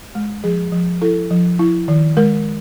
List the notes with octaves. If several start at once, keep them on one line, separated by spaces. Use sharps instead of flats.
G#3
F3 G#4
F3
E4 A4
F3
E4
D#3
G#3 A#4